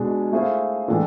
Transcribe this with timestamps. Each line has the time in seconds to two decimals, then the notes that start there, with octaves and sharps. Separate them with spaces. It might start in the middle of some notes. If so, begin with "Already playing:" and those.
Already playing: B2 G#3 D4 G#4
0.32 A3 E4 G#4 C5 F5
0.88 A2 E3 G#3 D4 A4